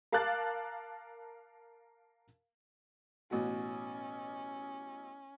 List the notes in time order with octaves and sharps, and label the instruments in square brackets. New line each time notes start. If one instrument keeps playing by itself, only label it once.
[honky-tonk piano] A#4 F5 A5 D6 F#6 A6
[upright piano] A1 B2 F#4 [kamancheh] C#4